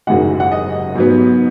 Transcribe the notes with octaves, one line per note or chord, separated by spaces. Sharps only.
F#1 F#2 D#3 G#3 F#5
F#5
D#5
G#2 F#3 B3